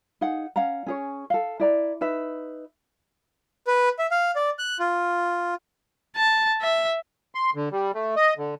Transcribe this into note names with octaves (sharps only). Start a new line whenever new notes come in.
D#4 G#4 F5 F#5
C#4 F5 F#5 A#5
C#4 G#4 C#5
A4 F5
E4 D5 A#5
D#4 B4 E5
B4
E5
F5
D5
F#6
F4
A5
E5
C6
D3
G3
A3
D#5
D3